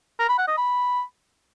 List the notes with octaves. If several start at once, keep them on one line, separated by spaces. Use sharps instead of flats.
A#4
B5
F#5
D#5
B5